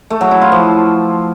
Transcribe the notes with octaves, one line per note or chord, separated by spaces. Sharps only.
A3
F#3
E4
F4
F3